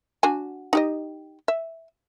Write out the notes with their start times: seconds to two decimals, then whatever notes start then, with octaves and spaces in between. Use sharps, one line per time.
0.23 D4 F#4 G#5
0.73 D#4 G4 D#5
1.48 E5